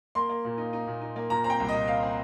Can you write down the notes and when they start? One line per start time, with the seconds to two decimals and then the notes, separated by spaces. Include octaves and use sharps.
0.15 A#3 C6
0.29 A#3
0.45 A#2
0.58 D#4
0.73 D#4
0.87 A#2
1.01 D#4
1.16 A#3
1.30 A#2 A#5
1.44 C4 A#5
1.50 G5
1.60 C2
1.69 A#2 D#5
1.88 C4 F5
2.03 C4